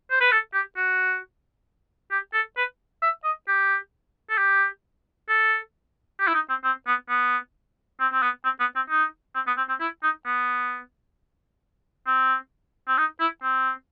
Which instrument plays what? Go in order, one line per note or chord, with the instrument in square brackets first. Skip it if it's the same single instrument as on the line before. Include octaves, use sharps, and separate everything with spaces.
[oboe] C5
B4
A4
G4
F#4
G4
A4
B4
E5
D#5
G4
A4
G4
A4
G4
E4
D#4
C4
C4
B3
B3
C4
C4
B3
C4
B3
C4
D#4
C4
B3
C4
C4
E4
D#4
B3
C4
C4
D#4
E4
C4